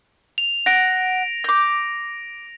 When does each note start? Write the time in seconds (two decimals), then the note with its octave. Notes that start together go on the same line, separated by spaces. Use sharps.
0.38 F7
0.66 F#5 A#6 D7
1.44 D6 G6